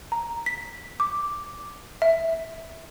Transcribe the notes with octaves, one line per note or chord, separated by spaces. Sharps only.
A#5
B6
D6
E5